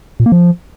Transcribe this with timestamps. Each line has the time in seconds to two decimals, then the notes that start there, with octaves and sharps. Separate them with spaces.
0.20 A#2
0.26 A#3
0.32 F3